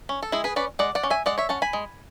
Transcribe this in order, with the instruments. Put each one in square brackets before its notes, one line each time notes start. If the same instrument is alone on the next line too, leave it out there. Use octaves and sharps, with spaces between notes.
[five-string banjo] C#4
A4
G#3 E4 G#4
G#4 B4
C#4 B4 D5
G#3 D5 F#5
D5 F#5
C#4
E5 G#5
G#3 D5 F#5
C#5 E5
C#4 F#5 A5
G#5 B5
G#3